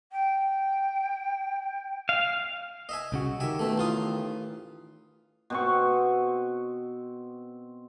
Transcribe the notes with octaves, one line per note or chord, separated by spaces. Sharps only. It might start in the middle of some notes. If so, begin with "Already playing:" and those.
G5
F5
D#5 E5 G#5
C2 C#3 F#4
D#3 G4 E5 G#5
B2 A3
A1 F4 D#6
B2 C4 C#6